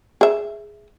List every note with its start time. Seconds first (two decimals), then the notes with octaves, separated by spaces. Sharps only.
0.21 G#4 E5